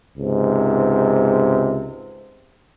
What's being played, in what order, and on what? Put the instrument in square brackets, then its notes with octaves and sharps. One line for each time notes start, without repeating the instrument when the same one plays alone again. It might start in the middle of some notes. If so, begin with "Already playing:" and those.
[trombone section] C#2 G#2 C3